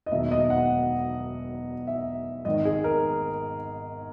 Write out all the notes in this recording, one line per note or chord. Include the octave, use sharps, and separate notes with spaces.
D#5
E1 E2 D#3 F#3 A#3 E5
D#5
F#5
E5
G#1 G#2 D#3 D#5
G#4
A#4